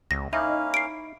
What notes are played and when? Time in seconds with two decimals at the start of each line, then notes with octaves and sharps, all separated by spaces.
0.11 C#2 A#6
0.33 A#3 C#4 D#4 E4 F5
0.74 C7 D7